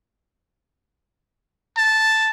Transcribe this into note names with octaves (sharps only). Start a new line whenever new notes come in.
A5